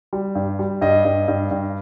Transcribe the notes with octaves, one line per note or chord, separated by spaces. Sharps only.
G3
G2
G3
G2 D#5
G2
G2
G2